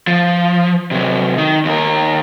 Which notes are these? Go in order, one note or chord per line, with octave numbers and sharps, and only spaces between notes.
F3
C3 F#3
D#3
D#2 A#4